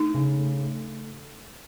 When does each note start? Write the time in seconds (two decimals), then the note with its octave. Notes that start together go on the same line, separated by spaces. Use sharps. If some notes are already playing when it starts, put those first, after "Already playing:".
Already playing: A3 D#4
0.14 C#3
0.38 A3
0.61 A3